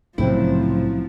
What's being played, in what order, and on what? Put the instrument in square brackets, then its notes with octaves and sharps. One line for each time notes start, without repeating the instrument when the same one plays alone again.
[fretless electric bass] C2 A2 C#3 [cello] F3 [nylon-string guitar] F#3 C4 E4